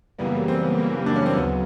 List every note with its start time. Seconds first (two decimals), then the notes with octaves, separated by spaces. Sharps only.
0.18 F#2 C#3 E3 G3 A#3 B3
0.48 C4
0.63 B3
0.77 F#2 C#3 E3 G3 A#3
1.06 D4
1.16 C#4
1.26 C4
1.35 D2 C#3 F#3 B3